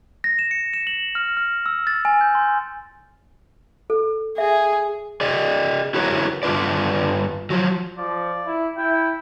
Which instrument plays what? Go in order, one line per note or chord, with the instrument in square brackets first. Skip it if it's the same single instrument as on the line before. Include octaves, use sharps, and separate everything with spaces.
[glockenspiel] A#6
E7
C#7
E7
F#7
F6
F6
E6
A6
G#5
G6
C6
[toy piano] A4
[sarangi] G#4 [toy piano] E5
[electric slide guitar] G#4 D5 D#5
E4 F#4 G4 A#4 B4 C#5
G2 D4 F4 B4 D5
F3 F#3
[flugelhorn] F3 [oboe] D5
[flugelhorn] E4
[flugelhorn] E4 [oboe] G5